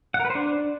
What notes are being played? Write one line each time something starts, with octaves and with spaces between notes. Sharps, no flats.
F#5
A#4
B4
C5
D4